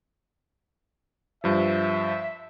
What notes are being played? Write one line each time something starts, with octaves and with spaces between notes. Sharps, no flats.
G2 F3 E5